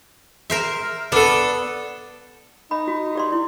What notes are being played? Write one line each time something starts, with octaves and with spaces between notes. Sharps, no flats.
A#4 C5 E5
B3 D4 A4
D#4 B5
F#4
G4 D5 C6
E4